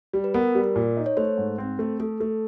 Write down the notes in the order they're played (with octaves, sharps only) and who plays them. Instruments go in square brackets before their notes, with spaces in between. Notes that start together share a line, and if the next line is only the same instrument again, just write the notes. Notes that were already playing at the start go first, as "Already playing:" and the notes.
[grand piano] G3
[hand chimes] B4
[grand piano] B3 [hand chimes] A#4
[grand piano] G3
A#2
D#4
[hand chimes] C#5
[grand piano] A3 [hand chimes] C5
[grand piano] G#2
C4
A3
[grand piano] A3 [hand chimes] A4
[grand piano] A3